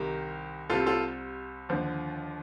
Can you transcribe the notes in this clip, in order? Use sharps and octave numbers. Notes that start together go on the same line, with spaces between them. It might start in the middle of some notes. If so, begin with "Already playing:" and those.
Already playing: C2 C3 D#3 G4 A#4
C2 C3 G3 F4 A4
F4 A4
D#2 D3 F3